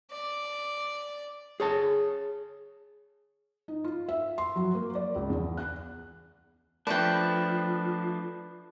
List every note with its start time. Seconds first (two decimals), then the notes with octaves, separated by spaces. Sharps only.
0.11 D5
1.60 G#4 C#5 A5
3.68 D#4
3.84 F4
4.09 E5
4.38 C6
4.56 F#3
4.75 A#3
4.95 D5
5.15 C#2
5.30 E2
5.57 F#6
6.87 F3 A3 D4 B4 G5